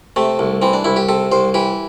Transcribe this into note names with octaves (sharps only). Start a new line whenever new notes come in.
C3 A3
C2
E3 C4
D4
C2 E4
G4
C3 A4
C2 C5
E3 G4